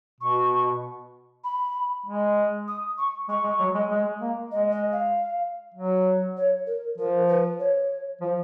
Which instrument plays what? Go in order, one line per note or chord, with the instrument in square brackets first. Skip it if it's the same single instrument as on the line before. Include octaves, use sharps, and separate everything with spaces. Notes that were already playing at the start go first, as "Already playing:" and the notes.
[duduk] B2 [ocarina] C#6
[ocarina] B5
[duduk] G#3
[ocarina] D#6
C#6
[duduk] G#3 [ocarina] C#6
[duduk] G#3
F#3
G#3
G#3
A#3
[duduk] G#3 [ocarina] D#5
[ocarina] D#5
F5
[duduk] F#3
[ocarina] C#5
A#4
[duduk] F3 [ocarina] A#4
[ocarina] B4
C#5
[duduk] F3